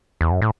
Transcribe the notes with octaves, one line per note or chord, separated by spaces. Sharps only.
E2
F#2
A2